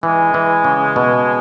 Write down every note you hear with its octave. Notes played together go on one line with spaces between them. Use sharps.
E3 G#3
E3
C#3
B2